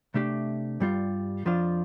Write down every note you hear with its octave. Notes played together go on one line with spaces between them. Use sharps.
C3 A3 D4 G4
G2 G3 F4
F2 F3 D4 F4